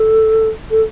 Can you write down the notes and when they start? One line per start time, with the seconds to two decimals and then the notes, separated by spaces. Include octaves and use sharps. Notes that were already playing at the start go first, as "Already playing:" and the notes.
Already playing: A4
0.71 A4